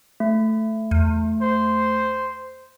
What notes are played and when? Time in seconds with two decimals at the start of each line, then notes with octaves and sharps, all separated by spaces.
0.20 A3
0.91 E2
1.42 C5